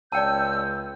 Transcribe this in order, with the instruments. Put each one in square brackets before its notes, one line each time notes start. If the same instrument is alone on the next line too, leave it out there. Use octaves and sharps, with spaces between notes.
[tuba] C#2 [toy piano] D5 G5 A5 [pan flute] E6 [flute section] G6